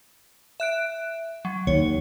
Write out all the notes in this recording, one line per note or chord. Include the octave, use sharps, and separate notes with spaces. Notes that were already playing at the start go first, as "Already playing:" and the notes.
E5 F#6 D7
F#3
D#2 C#5